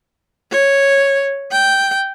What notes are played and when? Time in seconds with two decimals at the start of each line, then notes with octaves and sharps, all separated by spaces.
0.51 C#5
1.52 G5